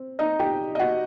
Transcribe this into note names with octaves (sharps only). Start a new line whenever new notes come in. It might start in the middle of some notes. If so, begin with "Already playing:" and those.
Already playing: C4
D#4 D#5
G4 G5
D#5
F#4 F#5